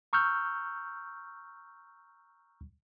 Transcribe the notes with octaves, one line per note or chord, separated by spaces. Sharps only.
A#5 C#6 E6 F6 G6